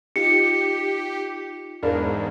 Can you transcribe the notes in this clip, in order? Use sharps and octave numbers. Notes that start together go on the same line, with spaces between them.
D#4 F4 G4 C#7
E2 G#2 D4 A#4 F5 B5